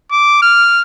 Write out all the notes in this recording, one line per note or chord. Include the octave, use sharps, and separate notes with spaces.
D6
F6